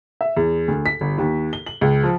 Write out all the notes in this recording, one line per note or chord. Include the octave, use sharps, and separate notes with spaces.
E5
E2
D2
B6
G1
D#2
G7
F#7
C#2
F3